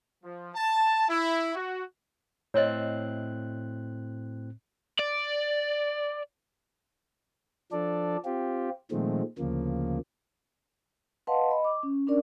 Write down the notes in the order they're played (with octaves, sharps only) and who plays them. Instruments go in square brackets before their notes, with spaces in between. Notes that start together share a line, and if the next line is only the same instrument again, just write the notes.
[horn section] F3
A5
E4
F#4
[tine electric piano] A2 C4 F#6 [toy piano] C#5 D#5
[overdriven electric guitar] D5
[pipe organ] F3 D4 A4 D5
C4 F4 G4
A#2 D#3 F3 G#3 A3 C4
D2 C#3 F3 A#3
[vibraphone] B4 D#5 F5 F#5 A5 C6
D#5 B5
D6
C#4
C#4 D4 A#4 D5